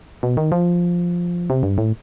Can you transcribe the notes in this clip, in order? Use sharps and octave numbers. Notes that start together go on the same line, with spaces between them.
B2
D#3
F3
C3
G2
A2